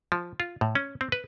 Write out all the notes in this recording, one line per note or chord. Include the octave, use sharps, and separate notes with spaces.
F3
F4
A2
C#4
C4
B4